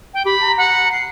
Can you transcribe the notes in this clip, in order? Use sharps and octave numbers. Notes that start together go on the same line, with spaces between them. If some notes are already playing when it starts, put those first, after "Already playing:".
G5
G4 B5
A#5
F#5
C7